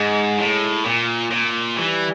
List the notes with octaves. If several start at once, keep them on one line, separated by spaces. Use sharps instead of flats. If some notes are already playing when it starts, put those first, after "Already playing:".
Already playing: G#2 G#3
A2
A#2
A#2
E3 G3